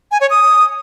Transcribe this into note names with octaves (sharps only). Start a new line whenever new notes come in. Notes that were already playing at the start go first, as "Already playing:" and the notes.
G#5
C#5
D#6